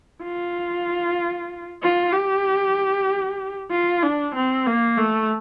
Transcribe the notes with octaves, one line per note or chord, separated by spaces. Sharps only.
F4
F4
G4
F4
D4
C4
A#3
A3